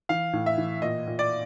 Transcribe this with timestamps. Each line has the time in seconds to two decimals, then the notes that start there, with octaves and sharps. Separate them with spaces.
0.09 E3 F5
0.33 A2
0.46 E5
0.58 E3
0.82 A#2 D#5
1.07 A#2
1.19 D5